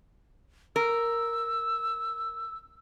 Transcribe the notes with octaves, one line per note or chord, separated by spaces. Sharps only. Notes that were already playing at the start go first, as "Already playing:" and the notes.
A#4 E6